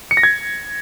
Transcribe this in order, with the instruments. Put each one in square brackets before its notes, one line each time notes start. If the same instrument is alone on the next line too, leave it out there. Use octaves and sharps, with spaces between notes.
[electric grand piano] C#7
A#6
G#6